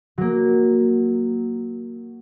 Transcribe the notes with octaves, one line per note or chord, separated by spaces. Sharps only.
F#3 A#3